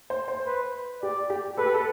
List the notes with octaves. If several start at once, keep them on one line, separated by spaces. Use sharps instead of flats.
C5
C5
B4
G4 D5
G4
A4 B4
G4
A4